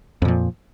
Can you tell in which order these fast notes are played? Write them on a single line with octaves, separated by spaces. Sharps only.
F2 A#2 F3